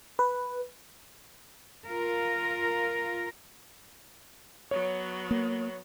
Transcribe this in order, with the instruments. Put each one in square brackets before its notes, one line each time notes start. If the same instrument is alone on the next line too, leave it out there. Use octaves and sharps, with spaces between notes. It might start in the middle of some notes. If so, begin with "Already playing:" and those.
[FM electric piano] B4
[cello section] F4 A#4
[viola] F#3 B3 [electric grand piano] C#5
[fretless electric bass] A#3